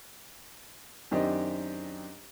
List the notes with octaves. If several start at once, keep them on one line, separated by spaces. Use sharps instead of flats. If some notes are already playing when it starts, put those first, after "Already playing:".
F#2 D#3 C4 D4 G4 D#5